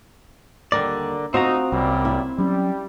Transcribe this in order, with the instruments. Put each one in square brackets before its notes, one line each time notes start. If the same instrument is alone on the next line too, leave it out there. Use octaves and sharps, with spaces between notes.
[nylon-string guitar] D#2 G3 [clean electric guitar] D3 A#4 D5
[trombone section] D2 D#4 [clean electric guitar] C4 A#5 [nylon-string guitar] F4 F#4
[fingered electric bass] C2 [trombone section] F#2 A#2 G3
[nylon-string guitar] E4
[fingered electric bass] F#3 C#4 [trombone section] G3